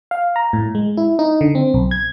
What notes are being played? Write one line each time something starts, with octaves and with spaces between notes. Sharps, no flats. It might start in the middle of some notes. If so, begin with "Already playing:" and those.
F5
A#5
A2
G#3
E4
D#4
D3
C4
B1
G#6